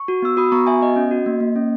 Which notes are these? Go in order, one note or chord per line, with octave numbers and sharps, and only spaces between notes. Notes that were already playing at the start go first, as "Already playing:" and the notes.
Already playing: C#6
F#4
B3 E6
F#4 B5 D#6
B3 A#5 C#6
F#4 E5 G#5
B3 D#5
C#4
F#4
A#3
A#3
C#4